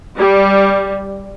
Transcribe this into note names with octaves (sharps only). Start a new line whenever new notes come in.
G3